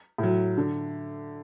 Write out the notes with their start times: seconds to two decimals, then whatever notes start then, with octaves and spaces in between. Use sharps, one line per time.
0.18 A2 F#3
0.57 D3